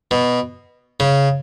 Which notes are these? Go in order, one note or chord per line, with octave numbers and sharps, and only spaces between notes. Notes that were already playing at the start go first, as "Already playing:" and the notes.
B2
C#3